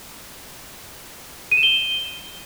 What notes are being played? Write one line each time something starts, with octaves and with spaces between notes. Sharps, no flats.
D#7
E7
G7